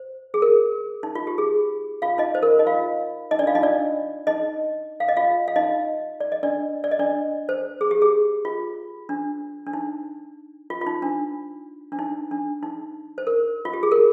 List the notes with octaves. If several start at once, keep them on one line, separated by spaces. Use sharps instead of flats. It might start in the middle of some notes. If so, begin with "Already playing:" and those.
Already playing: C5
G#4
A#4
D#4
F4
G4
G#4
F4 F5
D#4 D#5
C5
A#4
D#4 D#5
F4 F5
D#4 D#5
D4 D5
F4 F5
D#4 D#5
D4 D5
D#4 D#5
F5
D#5
F4 F5
F5
D#4 D#5
D5
D#5
D4 D5
D5
D#5
D4 D5
C5
G#4
G4
G#4
F4
D4
D4
D#4
F4
F4
D#4
D4
D4
D#4
D4
D#4
C5
A#4
F4
G4
G#4
A#4